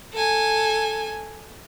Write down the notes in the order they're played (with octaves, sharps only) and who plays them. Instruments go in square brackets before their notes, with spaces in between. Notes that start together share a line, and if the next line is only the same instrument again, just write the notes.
[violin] A4 G#5